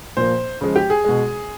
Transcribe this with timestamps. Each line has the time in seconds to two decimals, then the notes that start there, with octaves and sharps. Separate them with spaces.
0.17 A#2 F3 A#3 C5
0.61 C#3 F3 G#3
0.76 G4
0.90 G#4
1.04 B2 G#3